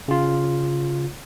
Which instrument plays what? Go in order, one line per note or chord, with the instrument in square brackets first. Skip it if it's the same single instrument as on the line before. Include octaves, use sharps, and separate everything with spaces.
[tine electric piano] C#3 F4